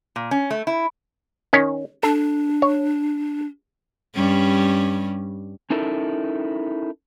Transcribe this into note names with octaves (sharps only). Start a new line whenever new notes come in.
A#2
C#4
A3
E4
D#3 C#4 C#5
D4 A4
C#5
G2 G3 C#4
C#4 D#4 E4 A4 A#4